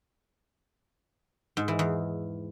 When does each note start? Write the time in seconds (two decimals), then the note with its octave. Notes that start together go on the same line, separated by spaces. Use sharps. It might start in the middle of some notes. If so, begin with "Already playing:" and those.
1.57 G#2
1.68 E3
1.79 E2